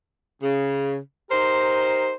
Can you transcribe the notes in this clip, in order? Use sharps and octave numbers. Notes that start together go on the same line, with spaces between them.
C#3
D#4 G4 A#4 C5